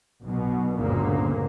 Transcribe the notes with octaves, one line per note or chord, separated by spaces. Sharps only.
B1 B2
G1 D2 G2 A#2 C#3 A#3